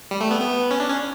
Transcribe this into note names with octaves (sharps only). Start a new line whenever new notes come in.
G3
A3
B3
B3
C#4
D4
C#4